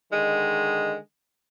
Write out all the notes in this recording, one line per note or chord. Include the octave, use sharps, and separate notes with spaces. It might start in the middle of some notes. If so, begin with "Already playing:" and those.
D3 D#3 G#3